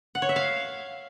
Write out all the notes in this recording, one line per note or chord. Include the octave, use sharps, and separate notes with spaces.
F#5
C#5
E5
F5